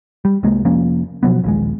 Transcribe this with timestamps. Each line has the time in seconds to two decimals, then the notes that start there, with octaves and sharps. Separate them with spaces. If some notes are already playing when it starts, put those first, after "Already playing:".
0.25 G3
0.43 C2 G#3 A#3
0.65 F1 F3 A#3 C#4
1.23 B2 F3 F#3 B3
1.44 A#1 D#2 G#3